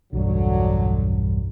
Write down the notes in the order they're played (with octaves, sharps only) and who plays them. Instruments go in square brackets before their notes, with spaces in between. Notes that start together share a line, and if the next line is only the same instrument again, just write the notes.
[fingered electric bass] B1 E2 G2 [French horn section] D3 F#3